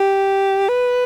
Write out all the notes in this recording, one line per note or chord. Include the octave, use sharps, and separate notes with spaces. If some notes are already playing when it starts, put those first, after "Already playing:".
Already playing: G4
B4